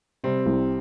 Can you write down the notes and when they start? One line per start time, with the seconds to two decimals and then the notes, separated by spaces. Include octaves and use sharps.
0.24 C3 G3 C4
0.46 C2